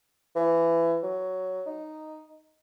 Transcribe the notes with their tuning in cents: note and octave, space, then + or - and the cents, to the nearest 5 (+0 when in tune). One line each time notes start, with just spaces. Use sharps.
E3 +20
F#3 +10
D#4 -5